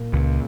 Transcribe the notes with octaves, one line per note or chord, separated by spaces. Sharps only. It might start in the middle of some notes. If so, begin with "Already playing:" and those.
Already playing: A#2 A#3
C#2